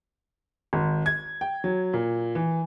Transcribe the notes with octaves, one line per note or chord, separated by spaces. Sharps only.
G#1
G#6
G5
F#3
A#2
E3